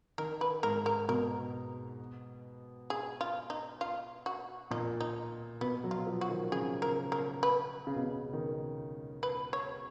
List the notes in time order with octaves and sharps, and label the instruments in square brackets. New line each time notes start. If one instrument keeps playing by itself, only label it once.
[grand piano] D#3 [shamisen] A#4
[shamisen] B4
[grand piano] G#2 [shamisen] A#4
[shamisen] A#4
[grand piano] B2 [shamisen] A#4
[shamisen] G#4
F4
D#4
F4
F#4
[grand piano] A#2 [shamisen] D#4
[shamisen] D#4
[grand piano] B2 [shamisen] B3
[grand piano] F#3
[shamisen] F4
[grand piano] F3
[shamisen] F#4
[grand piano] D#3
[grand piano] C#3 [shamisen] G#4
[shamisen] A#4
A#4
B4
[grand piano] C#3
B2
C#3
D#3
[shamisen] B4
C#5